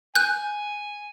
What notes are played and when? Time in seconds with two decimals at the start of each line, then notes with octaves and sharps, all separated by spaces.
0.15 G#5 F#6 G6